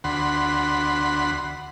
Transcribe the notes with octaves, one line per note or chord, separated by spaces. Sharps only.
D2 F#5 B5 C6